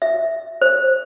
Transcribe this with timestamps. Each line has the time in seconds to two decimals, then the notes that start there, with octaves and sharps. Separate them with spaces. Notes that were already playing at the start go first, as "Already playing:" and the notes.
0.02 E5
0.61 C5